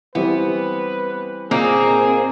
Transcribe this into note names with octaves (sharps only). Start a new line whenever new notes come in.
E3 G3 B3 C4 B4
A#2 A#3 C4 D#4 G#4